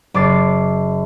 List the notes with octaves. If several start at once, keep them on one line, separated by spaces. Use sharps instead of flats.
F#1 D6 A6 C7